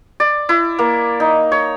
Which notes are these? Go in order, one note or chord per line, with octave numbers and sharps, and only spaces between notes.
D5
E4
A#3
D#4
C#5